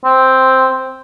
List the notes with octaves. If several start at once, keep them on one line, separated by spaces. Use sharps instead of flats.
C4